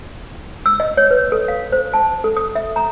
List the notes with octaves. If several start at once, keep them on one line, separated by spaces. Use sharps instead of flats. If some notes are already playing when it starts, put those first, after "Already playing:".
E6
D#5
C#5
B4
A4
F5
C5
A5
A4
D#6
E5
A#5